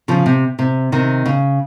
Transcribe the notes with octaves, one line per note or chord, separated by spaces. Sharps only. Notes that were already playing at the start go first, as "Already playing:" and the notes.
C#3 F3
C3
C3
C3 D#3
C#3